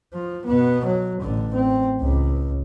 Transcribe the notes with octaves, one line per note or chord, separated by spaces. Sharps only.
F3
B2 B3
F#3
A1 D3
C4
C#2